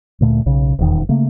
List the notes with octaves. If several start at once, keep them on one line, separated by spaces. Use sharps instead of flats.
D2 A#2 A3
B1 C#3
D#1 E2 D#3
C#3 A3 A#3